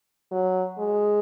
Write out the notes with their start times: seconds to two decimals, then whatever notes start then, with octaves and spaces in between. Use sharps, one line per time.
0.31 F#3
0.78 G#3